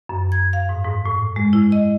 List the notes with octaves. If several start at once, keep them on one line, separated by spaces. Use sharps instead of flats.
F#2
G#6
F5
G#2
G#2
A2
G#3
E4
D#5